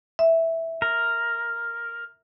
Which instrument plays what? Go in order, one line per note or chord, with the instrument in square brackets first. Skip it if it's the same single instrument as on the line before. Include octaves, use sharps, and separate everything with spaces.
[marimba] E5
[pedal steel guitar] A#4